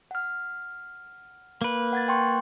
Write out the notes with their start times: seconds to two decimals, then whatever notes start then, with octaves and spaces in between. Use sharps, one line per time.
0.11 F#5 F6
1.62 A#3 B4
1.93 F#5 G#6 A6
2.08 G5 C6 C#6